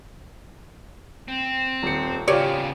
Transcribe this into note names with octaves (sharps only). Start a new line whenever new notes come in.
C4
D#1 C#7
C#3 B3 F4 G4 C#5 D5